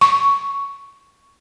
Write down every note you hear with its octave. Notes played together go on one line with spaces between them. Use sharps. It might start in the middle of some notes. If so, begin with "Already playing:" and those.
C#6